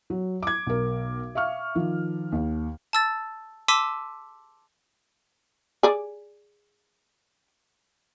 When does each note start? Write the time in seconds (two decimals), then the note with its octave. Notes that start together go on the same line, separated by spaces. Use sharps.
0.10 F#3
0.43 D6 G#6
0.67 B1 A#4
1.35 E5 F5 C#6 F6
1.75 D#3 F3
2.32 D#2
2.93 A5 E6 A6
3.68 A5 C6 D6 E6 B6 D#7
5.83 G#4 D5